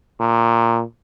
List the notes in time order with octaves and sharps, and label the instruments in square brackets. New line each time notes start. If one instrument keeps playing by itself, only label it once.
[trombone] A#2